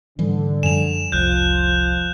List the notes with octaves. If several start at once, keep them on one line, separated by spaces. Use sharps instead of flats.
G#2 D3 E3 G3
F#2 F3 G3 G#5 E7 F7
F1 C2 F3 F#6 G6